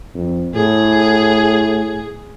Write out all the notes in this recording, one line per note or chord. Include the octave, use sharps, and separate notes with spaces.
F2
A2 G#4